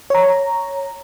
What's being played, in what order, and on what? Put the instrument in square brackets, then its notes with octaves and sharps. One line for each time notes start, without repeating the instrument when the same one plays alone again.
[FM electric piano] C#5 A#5